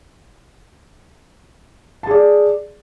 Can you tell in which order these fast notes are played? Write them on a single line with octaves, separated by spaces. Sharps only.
A5 G#4 D5